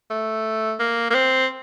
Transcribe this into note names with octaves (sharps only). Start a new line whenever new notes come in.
A3
A#3
A#3
C4